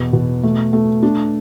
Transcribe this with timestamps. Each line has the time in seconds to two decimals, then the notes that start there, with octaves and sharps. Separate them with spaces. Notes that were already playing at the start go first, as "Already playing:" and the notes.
Already playing: E2 B2
0.13 B2
0.43 A3
0.73 A3
1.03 D4